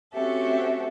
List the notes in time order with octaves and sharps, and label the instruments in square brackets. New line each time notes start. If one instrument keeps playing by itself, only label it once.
[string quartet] C4 C#4 F#4 G4 A4 E5